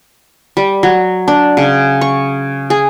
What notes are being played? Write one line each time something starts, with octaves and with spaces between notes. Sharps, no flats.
G3
F#3
D4
C#3
C#6
G#4